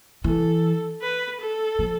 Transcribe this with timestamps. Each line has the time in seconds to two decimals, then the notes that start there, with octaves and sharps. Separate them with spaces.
0.24 E3 A4
1.02 B4
1.40 A4
1.79 F3